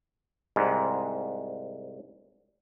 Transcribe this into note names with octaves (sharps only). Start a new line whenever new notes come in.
C2 G#2